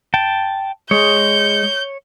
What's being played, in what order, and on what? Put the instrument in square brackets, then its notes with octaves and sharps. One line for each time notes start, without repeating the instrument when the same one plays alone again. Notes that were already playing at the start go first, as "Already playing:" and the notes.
[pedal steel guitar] G5 A5
[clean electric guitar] G#3 [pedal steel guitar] C#5 [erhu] G6